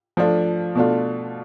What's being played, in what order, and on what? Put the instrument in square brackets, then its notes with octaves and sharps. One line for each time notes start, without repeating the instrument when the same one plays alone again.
[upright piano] F3 A3 D4 F4
B2 A3 D4 F4